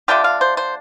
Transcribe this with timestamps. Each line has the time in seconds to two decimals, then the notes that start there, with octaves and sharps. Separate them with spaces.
0.08 D3 A3 D4 F4 G4
0.24 F5
0.41 C5
0.57 C5